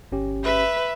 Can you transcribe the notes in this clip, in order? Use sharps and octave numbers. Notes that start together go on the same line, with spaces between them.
G1 C#4 G4
B4 E5